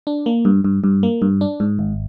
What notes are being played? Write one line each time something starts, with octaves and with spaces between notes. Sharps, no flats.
D4
A#3
G2
G2
G2
A#3
G2
D4
G#2
G#1